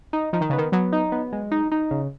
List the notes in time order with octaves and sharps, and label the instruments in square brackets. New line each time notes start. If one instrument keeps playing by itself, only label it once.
[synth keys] D#4
[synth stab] F3 [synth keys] D#4
[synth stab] D#3
C#3
[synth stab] D#3 [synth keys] B3
[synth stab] F#3 [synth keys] B3
[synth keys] D#4
B3
G#3
D#4
D#4
C#3